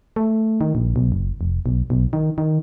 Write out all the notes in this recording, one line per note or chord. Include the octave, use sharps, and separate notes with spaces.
A3
D#3
A#1
B1
F#1
F1
B1
B1
D#3
D#3